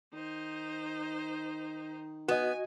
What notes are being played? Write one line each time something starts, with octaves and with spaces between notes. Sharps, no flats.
D#3 D#4 C5
B3 F#4 D#5 G#5